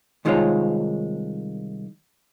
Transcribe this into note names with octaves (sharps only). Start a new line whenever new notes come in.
C2 D#3 G#3 F4 C5 C#5